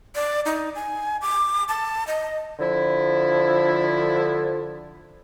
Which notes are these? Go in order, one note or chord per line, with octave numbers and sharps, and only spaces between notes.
D5
D#4
G#5
D6
A5
D#5
D3 F3 E4